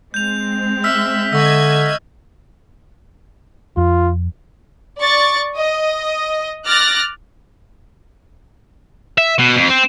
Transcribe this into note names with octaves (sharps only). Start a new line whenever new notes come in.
G#3 C4 G6 F7
E5 E6 F6 B6
D3 D#5 E5 C#6 E6 G#6
F2 F4
D5 C#6 A6
D#5
D6 F6 F#6 A6 A#6
E5
B2
F2
C4